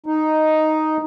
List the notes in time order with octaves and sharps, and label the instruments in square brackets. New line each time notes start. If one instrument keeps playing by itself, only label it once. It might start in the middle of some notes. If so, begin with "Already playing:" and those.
[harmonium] D#4